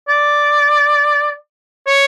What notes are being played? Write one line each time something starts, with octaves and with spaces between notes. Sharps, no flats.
D5
C#5